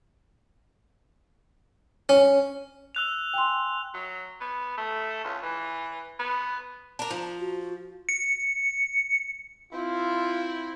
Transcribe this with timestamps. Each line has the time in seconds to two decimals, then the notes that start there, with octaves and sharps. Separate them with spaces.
2.09 C#4
2.95 E6 F#6 F7
3.34 G5 G#5 C6
3.94 F#3
4.41 B3
4.77 A3
5.24 C#2
5.42 E3
6.19 B3
6.99 D4 A#4
7.10 F3
7.40 F#4
8.09 C#7
9.73 C4 E4 F4